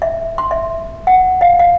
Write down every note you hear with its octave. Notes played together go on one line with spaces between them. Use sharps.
E5
C6
E5
F#5
F5
F5